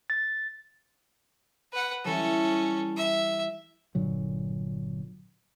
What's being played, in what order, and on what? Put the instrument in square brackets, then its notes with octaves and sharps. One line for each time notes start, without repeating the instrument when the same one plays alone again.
[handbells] A6
[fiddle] B4 F#5
[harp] E3 G3 [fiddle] C#4 A4
[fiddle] E5
[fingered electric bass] G1 A#2 D3 F#3